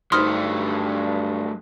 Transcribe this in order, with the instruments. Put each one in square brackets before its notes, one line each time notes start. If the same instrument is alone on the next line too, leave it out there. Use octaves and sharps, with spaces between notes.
[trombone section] G2 [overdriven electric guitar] F#3 A3 [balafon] D#4 C5 [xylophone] C6 D#6 F6